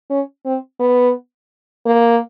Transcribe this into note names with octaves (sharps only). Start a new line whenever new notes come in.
C#4
C4
B3
A#3